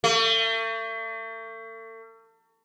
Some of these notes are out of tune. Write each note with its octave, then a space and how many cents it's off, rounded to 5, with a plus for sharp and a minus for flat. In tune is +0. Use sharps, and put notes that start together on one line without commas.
A3 +40